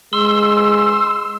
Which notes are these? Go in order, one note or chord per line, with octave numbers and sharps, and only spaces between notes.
G#3 C6 E6